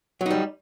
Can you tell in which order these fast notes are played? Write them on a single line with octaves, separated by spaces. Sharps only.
F#3 D#4 G3